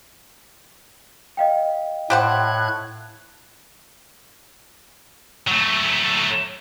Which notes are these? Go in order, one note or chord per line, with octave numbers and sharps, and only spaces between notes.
D#5 F5 G5
A2 G4 C5 F#5 F#6 G#6
F#3 A3